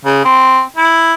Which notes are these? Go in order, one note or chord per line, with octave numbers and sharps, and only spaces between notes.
C#3
C4
E4